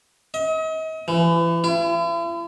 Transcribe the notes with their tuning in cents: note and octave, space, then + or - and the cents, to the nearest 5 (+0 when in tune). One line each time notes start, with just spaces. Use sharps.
D#5 +40
E3 +30
E4 +45